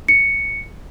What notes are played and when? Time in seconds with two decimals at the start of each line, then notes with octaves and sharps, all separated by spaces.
0.08 C#7